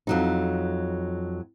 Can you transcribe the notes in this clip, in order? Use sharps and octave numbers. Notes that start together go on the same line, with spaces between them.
F2 F#3 D#4